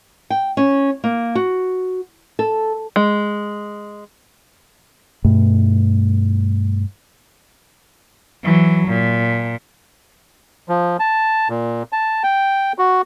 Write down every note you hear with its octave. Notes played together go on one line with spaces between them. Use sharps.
G5
C#4
A#3
F#4
A4
G#3
G2 B2 A3
E3 F#3
A#2
F3
A5
A#2
A5
G5
F#4